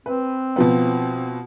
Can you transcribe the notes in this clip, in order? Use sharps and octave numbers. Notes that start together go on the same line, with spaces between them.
C4 B4
B2 F3 B3